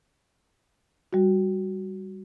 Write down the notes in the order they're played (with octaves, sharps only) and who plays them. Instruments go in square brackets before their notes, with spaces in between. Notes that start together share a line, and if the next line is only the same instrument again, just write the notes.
[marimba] G3 F#4